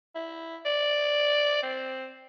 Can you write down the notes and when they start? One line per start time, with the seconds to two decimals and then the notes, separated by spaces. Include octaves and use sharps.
0.15 E4
0.66 D5
1.63 C4